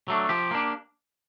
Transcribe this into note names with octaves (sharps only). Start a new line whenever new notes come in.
F#3 A3 D4
F3 G4
A#3 D4